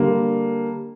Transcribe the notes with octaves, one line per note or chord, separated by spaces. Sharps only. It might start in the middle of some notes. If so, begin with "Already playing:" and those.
Already playing: D3 G3 A#3